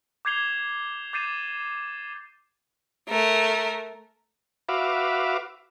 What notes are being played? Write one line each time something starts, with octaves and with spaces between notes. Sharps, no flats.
D6 G6 G#6 C7 F7 G7
D6 G6 A6 C7 D#7 E7
A3 A#4
F#4 B4 E5 F5 D6